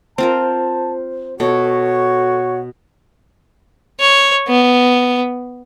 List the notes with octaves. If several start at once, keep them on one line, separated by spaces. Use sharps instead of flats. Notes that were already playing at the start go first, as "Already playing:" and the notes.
C4 F4 A#4 C5 A5
B2 F#4 A4 C#5
C#5
B3